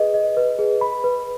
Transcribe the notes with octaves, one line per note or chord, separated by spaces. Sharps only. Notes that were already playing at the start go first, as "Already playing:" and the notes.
Already playing: G#4 B4 D#5
D#5
B4
G#4
B5
B4